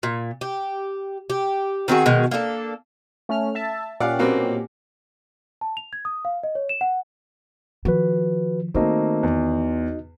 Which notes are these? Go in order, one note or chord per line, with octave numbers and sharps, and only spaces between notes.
A#2
G4
G4
D#3 C4 F#4 G#4
B2 D#3 G#3
A#3 D4 G4 A4
A3 C#4 F6
E5 A5
A#2 C#4 G4 D5 F5 F#5
B2 A#3 C4
A5
F7
G#6
D#6
F5
D#5
C#5
E7
F#5
D#3 F3 F#4 B4
D#3 A3 A#3 C4 D#4 F#4 D#5
E2